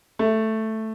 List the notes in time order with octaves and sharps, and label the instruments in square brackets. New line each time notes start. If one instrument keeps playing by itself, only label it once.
[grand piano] A3